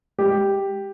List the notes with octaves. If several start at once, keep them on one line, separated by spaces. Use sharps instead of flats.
G#3 G4